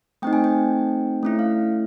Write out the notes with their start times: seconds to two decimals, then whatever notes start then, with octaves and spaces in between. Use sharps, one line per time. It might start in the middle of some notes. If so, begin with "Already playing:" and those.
0.22 A3 C4 D#4 G5
0.33 G#5
0.44 G5
1.23 A3 C#4 E4
1.39 F5